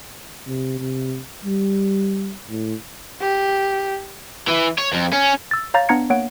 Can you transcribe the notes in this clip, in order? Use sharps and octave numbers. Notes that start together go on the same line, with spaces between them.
C3
C3
G3
A2
G4
E3
C#5
F2
C#4
E6 A6
C#5 F5 A#5 G6 A6
B3 D4 A#5 G#6 C#7
A#3 C#5 F#5 D7